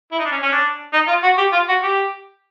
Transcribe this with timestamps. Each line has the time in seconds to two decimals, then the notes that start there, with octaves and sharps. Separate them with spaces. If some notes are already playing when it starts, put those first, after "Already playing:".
0.12 E4
0.19 D#4
0.25 D4
0.32 C#4
0.43 C#4
0.52 D4
0.93 D#4
1.08 F4
1.23 F#4
1.38 G4
1.53 F4
1.69 F#4
1.83 G4